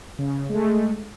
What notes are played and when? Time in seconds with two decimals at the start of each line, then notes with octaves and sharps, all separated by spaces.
0.19 C#3
0.49 G#3 A3